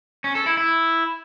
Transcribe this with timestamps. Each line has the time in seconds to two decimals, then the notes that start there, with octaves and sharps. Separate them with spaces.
0.24 C#4
0.35 A4
0.46 E4
0.57 E4